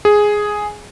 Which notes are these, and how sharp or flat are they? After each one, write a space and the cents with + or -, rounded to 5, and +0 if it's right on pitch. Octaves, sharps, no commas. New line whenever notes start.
G#4 +0 G#5 +0